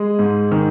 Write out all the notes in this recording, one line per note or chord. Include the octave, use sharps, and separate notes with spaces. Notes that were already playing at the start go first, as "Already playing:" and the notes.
Already playing: G#3 G#4
G#2
D#3